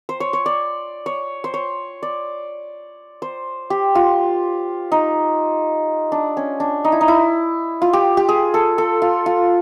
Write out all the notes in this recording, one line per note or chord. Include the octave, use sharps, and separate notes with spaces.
C5
C#5
C#5
D5
C#5
C5
C#5
D5
C5
G4
F4
D#4
D4
C#4
D4
D#4
E4
D#4
E4
F4
G4
G4
G#4
A4
A4
F4
F4